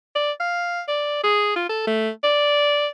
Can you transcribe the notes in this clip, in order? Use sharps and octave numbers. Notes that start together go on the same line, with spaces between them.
D5
F5
D5
G#4
F4
A4
A3
D5